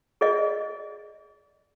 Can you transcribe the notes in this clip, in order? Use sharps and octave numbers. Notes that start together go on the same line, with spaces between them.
G#4 D5 D#5